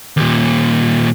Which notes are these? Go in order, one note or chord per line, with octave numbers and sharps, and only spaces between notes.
D#2 A#2